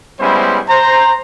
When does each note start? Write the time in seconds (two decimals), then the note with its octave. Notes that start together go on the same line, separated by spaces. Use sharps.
0.20 G3 G#3 B3 C#4 E4 C5
0.69 C5 A#5